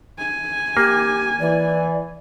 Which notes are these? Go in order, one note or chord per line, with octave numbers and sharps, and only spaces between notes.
G#5
A#3 G4
E3 D5